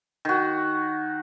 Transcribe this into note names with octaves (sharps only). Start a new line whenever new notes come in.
D#3 F#4